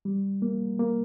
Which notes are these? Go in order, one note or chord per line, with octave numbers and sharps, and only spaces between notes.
G3
A#3
A#3